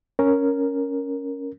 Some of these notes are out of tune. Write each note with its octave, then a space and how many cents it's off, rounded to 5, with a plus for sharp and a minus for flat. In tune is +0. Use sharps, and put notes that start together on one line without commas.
C#4 +0 A#4 +0